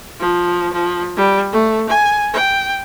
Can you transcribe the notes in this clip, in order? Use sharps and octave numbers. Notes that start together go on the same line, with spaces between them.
F3
F3
G3
A3
G#5
G5